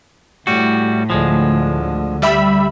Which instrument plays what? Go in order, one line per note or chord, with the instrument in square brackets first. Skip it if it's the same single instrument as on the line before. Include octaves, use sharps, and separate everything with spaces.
[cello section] A2 [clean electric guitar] G3 F#4
[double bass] D2 D3 [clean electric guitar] F3 G#3
[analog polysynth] G3 E5 B5